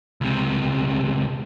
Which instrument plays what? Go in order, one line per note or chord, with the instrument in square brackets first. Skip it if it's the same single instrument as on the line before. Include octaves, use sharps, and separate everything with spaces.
[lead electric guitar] C#2 C3